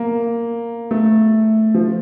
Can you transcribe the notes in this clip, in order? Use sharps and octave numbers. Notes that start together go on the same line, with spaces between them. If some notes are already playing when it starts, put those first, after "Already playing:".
Already playing: A#3
A3
F3